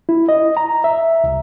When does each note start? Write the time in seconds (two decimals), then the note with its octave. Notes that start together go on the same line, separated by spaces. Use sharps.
0.09 E4
0.29 D#5
0.57 A#5
0.84 E5
1.24 C2